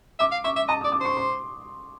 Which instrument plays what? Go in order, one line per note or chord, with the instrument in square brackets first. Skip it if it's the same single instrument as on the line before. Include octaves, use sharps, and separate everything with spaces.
[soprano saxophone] E5 [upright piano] D6
[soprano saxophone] F5
[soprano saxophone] E5 [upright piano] C#6
[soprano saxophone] E5
[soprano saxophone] D#5 [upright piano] A5
[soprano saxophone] D5 [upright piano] D#6
[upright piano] D6
[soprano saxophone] C5 [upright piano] C#6
[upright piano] C6